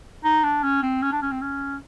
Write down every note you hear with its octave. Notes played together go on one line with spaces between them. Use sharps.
D#4
D4
C#4
C4
C#4
D4
C#4
C4
C#4